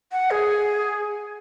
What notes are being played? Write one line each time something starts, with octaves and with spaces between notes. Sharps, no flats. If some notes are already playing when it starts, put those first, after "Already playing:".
F#5
G#4